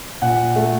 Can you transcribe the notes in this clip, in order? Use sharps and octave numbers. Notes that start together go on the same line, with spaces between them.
A#2 F#5
A3